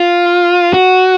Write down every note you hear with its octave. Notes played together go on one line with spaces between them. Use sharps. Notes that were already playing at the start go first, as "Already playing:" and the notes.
Already playing: F4
F#4